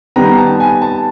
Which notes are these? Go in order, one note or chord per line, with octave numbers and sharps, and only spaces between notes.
D#3 G3 B3 A#5
A5
G#5
A5